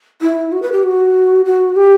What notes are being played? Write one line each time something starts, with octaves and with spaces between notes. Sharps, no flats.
E4
F#4
B4
G4
F#4
F#4
G4